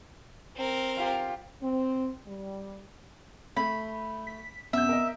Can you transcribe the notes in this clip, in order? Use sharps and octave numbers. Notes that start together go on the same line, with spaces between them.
C4 A#4
F4 G4
C4
G3
A3 B5
B6
F#2 C3 B3 E5 G6
A#4 D#5